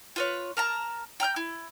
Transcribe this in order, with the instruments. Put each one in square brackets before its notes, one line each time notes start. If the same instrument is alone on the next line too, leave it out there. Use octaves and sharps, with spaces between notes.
[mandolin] F4 B4 C#5
A#4 A5 A#5
G5 A#5 F6 G6
E4